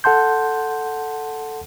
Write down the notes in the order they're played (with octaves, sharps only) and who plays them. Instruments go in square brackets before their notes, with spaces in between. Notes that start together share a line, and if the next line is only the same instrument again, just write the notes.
[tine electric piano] A4 F#5 A5 C6 G6